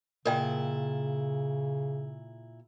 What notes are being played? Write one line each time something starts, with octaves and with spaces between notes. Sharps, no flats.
A#2 C#3 E4 A#4 D#5 G5